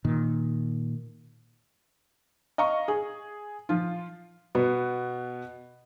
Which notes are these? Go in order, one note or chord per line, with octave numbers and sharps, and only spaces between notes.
A#2 D#3
D#5 F5 A#5 C#6
G#4
F3 F4
B2 B3